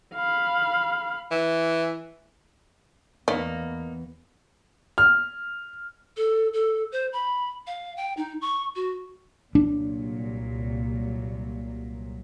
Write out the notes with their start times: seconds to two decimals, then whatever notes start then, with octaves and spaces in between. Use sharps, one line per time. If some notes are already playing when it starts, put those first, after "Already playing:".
0.15 F5 B5
1.31 E3
3.28 E2 E3 A#3 B3 D#4 D5 D#5
4.98 F6
6.17 A4
6.53 A4
6.92 C5
7.13 B5
7.67 F5
7.97 G5
8.17 D#4
8.42 C#6
8.76 F#4
9.55 C2 A#2 F#3 D4